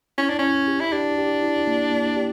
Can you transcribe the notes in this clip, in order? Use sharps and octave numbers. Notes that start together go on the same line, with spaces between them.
C#4 E4
D4
C#4 E4
G4
E4
D4 G4
G4
E4
A#3
A#3
G4